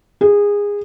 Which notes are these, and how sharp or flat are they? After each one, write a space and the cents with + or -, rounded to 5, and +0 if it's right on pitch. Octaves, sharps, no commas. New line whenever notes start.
G#4 -20